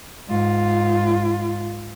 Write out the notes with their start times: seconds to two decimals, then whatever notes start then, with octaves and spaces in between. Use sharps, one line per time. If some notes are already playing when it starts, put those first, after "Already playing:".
0.29 G#2 F4